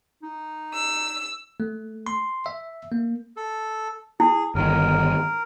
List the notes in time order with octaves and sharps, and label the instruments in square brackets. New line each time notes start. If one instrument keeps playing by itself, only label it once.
[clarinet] D#4
[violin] E6
[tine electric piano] A3
C6
E5
A#3
[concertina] A4
[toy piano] E4 [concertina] G#4
[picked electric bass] G1 D#3 [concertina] A#4